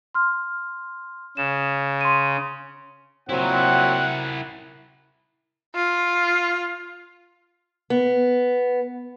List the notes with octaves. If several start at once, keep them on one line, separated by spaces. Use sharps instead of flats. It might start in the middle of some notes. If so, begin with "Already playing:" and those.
C6 F6
C#3 E7
C6 D#7
A#2 F#3 C4 E4 A#4 F#5
F4
B3